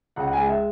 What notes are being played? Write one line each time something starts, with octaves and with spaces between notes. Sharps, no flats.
C#2 F#5
G#3 G#5
E5